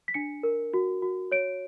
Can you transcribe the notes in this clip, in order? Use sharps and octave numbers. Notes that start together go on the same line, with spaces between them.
B6
D4 C#7
A#4
F#4
F#4
C#5 D7